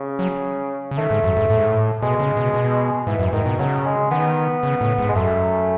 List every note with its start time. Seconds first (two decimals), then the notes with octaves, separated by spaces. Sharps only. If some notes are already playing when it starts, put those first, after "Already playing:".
Already playing: C#3
0.19 F#3
0.91 C#3
0.98 D#3 A3
1.11 G#2
1.24 F#2
1.37 G#2
1.50 A2
1.58 G#2
1.66 A2
2.02 B2 G#3
2.20 C#3
2.37 B2
2.54 B2
3.07 G#2 E3
3.19 F#2
3.27 E3
3.33 G#2 D#3
3.46 B2
3.59 C#3 F#3
3.85 G#3
4.11 D#3 B3
4.63 C#3
4.81 A2
4.98 G#2
5.09 G#3
5.16 F#2 A3